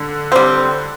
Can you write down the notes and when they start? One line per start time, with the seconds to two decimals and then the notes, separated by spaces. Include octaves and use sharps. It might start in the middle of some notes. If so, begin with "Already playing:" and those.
Already playing: D3
0.32 G3 C4